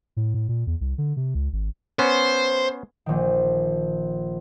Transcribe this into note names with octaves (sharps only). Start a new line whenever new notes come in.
A2
A2
A#2
E2
C2
D3
C3
C#2
G#1
B3 C#4 C5
A#1 D#3